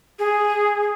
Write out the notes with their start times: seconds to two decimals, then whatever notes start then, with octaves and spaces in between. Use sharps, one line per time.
0.19 G#4